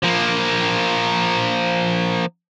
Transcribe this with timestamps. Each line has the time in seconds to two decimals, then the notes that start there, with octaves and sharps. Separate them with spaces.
0.03 F3 A#3